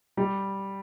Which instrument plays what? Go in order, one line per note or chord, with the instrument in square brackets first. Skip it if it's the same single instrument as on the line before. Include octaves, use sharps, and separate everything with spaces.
[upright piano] G3